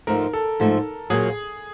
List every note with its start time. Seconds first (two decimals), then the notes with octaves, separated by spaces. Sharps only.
0.07 G#2 F3 A3 A#4
0.33 A4
0.60 G#2 F3 A3
1.10 A#2 F#3 A#3 G#4